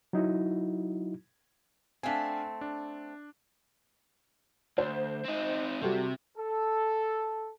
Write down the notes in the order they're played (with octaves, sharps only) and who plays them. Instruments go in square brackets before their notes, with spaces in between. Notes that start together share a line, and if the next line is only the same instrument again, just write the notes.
[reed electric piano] F#3 D#4 E4 F#4
[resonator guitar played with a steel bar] A3 C4 [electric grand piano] D4 F5 G#5
[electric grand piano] D4
[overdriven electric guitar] D2 [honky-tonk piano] C5
[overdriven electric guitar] C4 D#4
[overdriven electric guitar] C3 [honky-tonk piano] G3 F#4 A4
[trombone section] A4